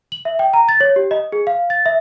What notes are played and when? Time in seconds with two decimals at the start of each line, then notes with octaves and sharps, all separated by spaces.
0.12 F#7
0.25 E5
0.39 G5
0.54 A#5
0.69 A6
0.81 C#5
0.96 G4
1.11 D#5
1.32 G#4
1.47 F5
1.70 A6
1.86 E5